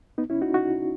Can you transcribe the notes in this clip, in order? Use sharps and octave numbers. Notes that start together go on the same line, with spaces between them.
B3 D#4
C#4 E4
D#4 F#4
D#4 F#4